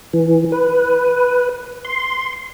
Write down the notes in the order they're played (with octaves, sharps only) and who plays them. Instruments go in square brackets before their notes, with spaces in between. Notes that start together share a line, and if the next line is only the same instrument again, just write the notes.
[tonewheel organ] E3
B4
C6